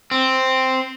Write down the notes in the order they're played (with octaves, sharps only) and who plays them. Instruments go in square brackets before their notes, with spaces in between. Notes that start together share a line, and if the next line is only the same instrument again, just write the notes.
[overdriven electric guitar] C4